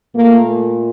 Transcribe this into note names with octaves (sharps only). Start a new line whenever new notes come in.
A#2 A3 A#3